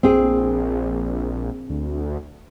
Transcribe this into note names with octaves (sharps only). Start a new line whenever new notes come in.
A#1 C4 G#4
D2